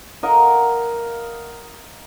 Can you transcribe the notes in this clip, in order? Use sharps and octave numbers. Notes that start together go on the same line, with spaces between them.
A#4 D#5 F5 F#5